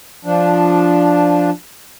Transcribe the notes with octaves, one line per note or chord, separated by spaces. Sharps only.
F3 D4